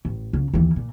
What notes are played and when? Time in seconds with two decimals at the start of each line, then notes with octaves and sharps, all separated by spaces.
0.05 A1
0.33 C#2
0.54 D#2 E3
0.76 A#2